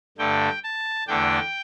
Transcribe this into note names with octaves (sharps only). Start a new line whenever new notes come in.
G2 D3 A3 G5
A5
E2 D3 A3 D4 G5